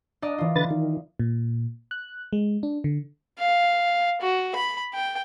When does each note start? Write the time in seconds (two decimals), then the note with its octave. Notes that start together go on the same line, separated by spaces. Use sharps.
0.22 D4 D5 D#5 A#5
0.38 E3 F4
0.56 D3 B4 A6
0.70 D#3
1.20 A#2
1.91 F#6
2.33 G#3
2.63 D4
2.84 D3
3.39 F5
4.21 F#4
4.55 B5
4.93 G5